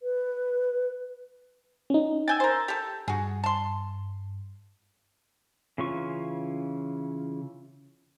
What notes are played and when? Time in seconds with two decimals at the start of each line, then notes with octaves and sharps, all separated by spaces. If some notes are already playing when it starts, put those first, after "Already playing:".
0.03 B4
1.90 C#4 D#4
2.28 G5 G#5 E6 G6 A6
2.40 A#4 C5
2.68 G4 A4
3.08 G2 F#4 G#4
3.44 A5 C6
5.78 C#3 E3 C#4 F4 C#6